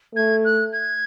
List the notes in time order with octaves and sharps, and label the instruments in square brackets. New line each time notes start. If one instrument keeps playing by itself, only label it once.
[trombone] A3 [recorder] G#6
[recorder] F#6
G#6